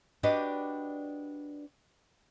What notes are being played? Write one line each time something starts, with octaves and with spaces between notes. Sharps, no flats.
D4 F#4 G4 B4 D5 D#5